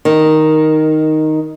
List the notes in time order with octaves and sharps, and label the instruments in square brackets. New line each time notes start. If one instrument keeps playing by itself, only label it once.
[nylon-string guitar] D#3